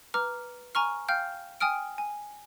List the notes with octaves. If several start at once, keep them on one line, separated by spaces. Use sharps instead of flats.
B4 A#5 D6 F6
G#5 A#5 C#6 F6
F5 G5 F6 G6
G5 G#5 D#6 F6 D7
G#5